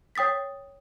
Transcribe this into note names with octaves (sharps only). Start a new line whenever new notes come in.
C#5 G5 D#6 A6 B6